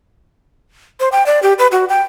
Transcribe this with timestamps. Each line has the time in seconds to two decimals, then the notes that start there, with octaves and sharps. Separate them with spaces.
1.00 C5
1.12 G5
1.26 D5
1.43 G4
1.59 B4
1.72 F#4
1.89 G5